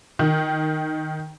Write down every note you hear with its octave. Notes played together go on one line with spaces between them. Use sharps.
D#3